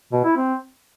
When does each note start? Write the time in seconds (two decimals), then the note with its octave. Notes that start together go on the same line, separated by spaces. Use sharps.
0.12 B2
0.24 E4
0.36 C4